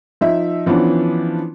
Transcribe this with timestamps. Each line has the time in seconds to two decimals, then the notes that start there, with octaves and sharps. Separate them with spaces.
0.21 F3 D#4 E5
0.66 E3 F3 B3 C#4 D4